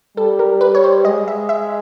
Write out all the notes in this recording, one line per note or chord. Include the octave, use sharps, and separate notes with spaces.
G3 A4
A#4
B4
C#5
C5
G#3 D#5
E5
E5